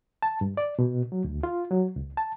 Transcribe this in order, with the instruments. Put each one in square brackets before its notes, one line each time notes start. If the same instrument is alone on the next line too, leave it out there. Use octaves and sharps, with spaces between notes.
[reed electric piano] A5
G2
D5
B2
F#3
D2
F4
F#3
C#2
A5